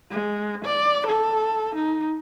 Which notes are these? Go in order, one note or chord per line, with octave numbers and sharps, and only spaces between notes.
G#3
D5
A4
D#4